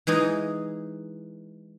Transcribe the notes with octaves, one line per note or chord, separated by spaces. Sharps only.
E3 G#3 D#4 G#4